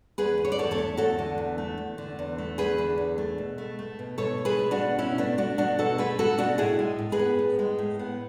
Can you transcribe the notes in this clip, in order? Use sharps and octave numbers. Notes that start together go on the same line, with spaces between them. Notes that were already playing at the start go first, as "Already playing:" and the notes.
E2 G#4 B4
D3
C#5
D5
E2 A4 C#5
A4 C#5
A3
E2 F#4 A4
D3
E2
A3
E2
D3
E2
A3
E2 G#4 B4
D3
E2
A3
B2
A3
A3
B2
B2 A4 C#5
A3
G#4 B4
A3
D4 F#4
B2
B2 C#4 E4
A3 B3 D4
A3 D4 F#4
B2 D4 F#4
B2 F#4 A4
A3 G#4 B4
A3 F#4 A4
B2 D4 F#4
A2 E4 G#4
G#3
A2
G#4 B4
B3
A2
G#3
A2
B3